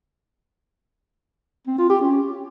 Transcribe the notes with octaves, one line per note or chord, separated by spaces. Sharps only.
C4
F4
G4
C#4